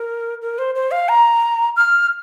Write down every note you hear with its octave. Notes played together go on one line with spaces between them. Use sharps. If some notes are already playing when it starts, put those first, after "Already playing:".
Already playing: A#4
A#4
C5
C5
F5
A#5
F6